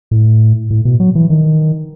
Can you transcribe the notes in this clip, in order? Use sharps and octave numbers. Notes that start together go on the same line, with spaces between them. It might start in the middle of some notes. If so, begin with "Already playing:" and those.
A2
A2
B2
F#3
E3
D#3